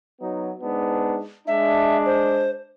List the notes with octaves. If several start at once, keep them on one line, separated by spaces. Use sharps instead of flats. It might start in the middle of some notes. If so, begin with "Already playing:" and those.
F#3 B3 D#4
G#2 B3 D4
G#3 D4 E5
C5